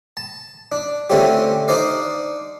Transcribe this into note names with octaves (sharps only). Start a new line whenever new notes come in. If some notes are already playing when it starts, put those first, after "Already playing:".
A5
D4
D3 A3 C4 C#4 F4 G4
D4 D#4 C5 D5 F5